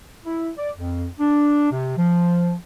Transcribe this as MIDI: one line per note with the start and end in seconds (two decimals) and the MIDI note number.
0.25 0.50 64
0.58 0.70 74
0.77 1.06 41
1.20 1.70 62
1.71 1.95 48
1.97 2.54 53